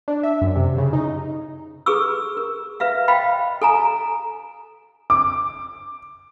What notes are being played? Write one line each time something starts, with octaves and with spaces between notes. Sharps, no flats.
D4
E5
F#2
C3
C#3
D#4
G#4 A4 B4 C#6 D6 E6
A#4
B4 E5 F5
C5 D#5 F5 G5 B5
A4 G#5 A#5
D6